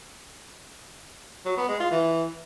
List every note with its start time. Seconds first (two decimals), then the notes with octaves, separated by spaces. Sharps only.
1.46 F#3
1.57 B3
1.68 G#3
1.80 F4
1.91 E3